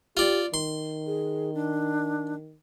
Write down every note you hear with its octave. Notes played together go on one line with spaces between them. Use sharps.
F4 G4 D5
D#3 C6
G#4
D4